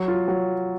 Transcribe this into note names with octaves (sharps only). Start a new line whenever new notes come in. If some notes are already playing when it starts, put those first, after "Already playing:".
Already playing: F#3
F4
F#3